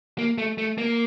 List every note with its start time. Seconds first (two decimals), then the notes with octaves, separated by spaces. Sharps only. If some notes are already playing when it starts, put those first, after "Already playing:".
0.18 A#3
0.38 A3
0.58 A3
0.78 A#3